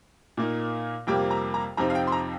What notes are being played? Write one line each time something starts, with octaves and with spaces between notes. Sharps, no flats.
A#2 A#3 D#4
F2 C3 G3 A#3 G5
A#5
A#5
F2 C3 F3 C4 D#4 A#5
F5
G5
C6
A#5